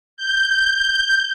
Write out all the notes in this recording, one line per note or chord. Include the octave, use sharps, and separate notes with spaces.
G6